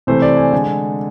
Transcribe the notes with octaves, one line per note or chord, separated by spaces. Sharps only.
C3 E3 A3 C5
D5
G#5
D3 G#3